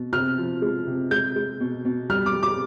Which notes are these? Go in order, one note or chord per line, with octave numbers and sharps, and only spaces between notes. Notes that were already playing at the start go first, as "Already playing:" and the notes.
Already playing: B2
C3 F6
F3
G#3
C3
G#3 G6
G#3
B2
B2
G3 F6
D6
G3
D6